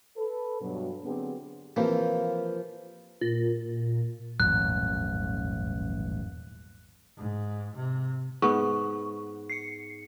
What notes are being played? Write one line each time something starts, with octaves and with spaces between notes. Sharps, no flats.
A4 B4
G2 B2 F#3
D3 F#3 B3 C4 G4 G#4
C3 E3 F3 A#3
A#2
D#1 A1 E2 G#2 F#3 F#6
G#2
C3
G#2 B3 C#6
C7 C#7